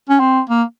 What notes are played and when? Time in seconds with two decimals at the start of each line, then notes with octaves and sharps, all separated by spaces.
0.09 C#4
0.20 C4
0.49 A#3